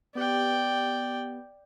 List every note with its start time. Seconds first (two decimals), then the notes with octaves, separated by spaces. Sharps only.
0.15 B3 G4 D5 G5